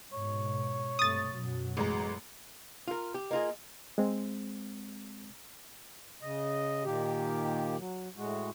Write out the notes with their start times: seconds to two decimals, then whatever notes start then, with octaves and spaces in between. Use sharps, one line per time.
0.13 G#2 B2 C#5
0.99 G2 C3 A3 D#6 A6
1.32 F#2 B2 F#3
1.77 A1 G#3 A#5
2.88 F4 A#4
3.14 G4
3.31 A#3 F4 G#4 D#5
3.98 G#3 C4
6.22 C#3 D#5
6.84 A#2 D#3 A#3 G4
7.78 F#3
8.16 A2 G#3 F#4